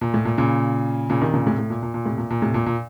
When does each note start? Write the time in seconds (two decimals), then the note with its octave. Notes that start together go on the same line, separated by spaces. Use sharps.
0.01 A#2
0.14 A2
0.25 A#2
0.38 A#2 C#3
1.10 A#2 C#3
1.21 C3 D#3
1.34 A#2 C#3
1.47 A2 C3
1.58 A2
1.70 A#2
1.83 A#2
1.94 A#2
2.05 A2 C3
2.18 A#2
2.30 A#2
2.42 A2 C3
2.54 A#2
2.66 A#2